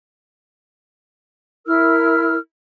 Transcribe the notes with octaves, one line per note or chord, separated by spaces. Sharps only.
E4 A#4 E6 F6